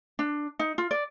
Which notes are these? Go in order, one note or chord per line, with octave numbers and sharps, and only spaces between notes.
D4
D#4
F4
D5